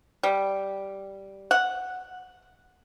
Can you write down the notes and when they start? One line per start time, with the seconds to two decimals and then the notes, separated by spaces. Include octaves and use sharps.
0.23 G3
1.51 F#5